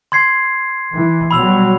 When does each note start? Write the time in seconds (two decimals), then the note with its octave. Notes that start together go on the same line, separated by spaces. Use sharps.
0.12 C6 G#6 C7
0.93 E3
1.31 B2 F#3 G3 B5 E6 F7